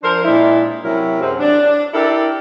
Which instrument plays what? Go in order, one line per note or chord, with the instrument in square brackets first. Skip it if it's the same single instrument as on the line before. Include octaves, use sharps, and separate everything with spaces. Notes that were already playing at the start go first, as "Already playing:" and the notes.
[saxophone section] F3 D4 A#4 C5
A#2 G#3 D4 E4
C3 F#3 C#4 E4 A#4
F#2 C3 F#3 G#3 C4
D4
D4 E4 G4 A4 A#4